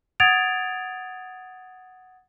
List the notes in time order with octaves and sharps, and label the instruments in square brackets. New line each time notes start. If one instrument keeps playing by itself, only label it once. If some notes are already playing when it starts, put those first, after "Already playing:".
[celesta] F#5 D#6 G#6 A6 D7 F7